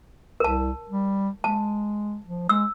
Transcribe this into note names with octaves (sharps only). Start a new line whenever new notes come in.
C2 A#4 A5
G3
G#3 A5
F3
G#3 E6